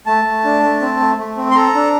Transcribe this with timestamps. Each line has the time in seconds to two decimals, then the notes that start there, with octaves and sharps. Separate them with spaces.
0.06 A3 A5
0.25 A3
0.45 D4
0.63 A3
0.82 C4
1.00 A3
1.18 A3
1.37 C4
1.51 C6
1.55 A4 A#5
1.75 D4